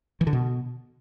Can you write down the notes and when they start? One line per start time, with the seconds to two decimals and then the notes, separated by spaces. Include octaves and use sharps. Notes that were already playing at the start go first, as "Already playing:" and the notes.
0.21 E3
0.27 D3
0.33 B2